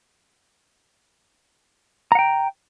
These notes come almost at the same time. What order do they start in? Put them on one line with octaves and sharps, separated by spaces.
A#5 F#5 G5